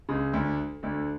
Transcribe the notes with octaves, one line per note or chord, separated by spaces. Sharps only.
C#2 C#3
D2 D3
D2 D3